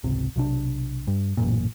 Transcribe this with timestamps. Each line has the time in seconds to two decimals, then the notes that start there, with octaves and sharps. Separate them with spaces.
0.04 G#1 C#2 C3
0.36 B1 C3 D4
1.07 G2
1.37 A1 F#2 A#2